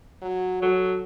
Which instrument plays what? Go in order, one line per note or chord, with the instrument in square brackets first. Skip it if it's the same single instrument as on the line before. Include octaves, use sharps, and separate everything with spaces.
[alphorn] F#3
[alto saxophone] F#3 [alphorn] A4